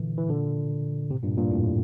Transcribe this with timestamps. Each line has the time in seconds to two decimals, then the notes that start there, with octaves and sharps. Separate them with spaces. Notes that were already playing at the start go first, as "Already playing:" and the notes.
Already playing: A#2 D3 E3
0.17 E3
0.29 A#2 D3
1.10 A2 C3
1.23 G2 A#2
1.37 G2 A#2
1.51 F2 A2